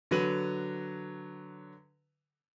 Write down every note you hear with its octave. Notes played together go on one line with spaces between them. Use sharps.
D3 F#3 B4 D#7 F#7